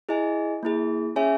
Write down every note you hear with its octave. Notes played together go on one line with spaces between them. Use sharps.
E4 G#4 D#5 G#5
A#3 E4 G#4
C#4 G#4 C#5 E5 G#5